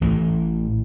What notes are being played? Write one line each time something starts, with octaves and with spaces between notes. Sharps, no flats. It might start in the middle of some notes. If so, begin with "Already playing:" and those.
A1 A2 E3